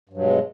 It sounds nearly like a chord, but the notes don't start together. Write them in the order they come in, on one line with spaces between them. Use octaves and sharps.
G2 F#3 B2 G#3